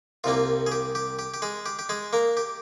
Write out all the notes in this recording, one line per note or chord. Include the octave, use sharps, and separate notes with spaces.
C2 C3 G3 A#3 F4
G#4
G4
G4
G4
G4
G#3 G#4
G4
G4
G#3 G#4
A#3 A#4
G4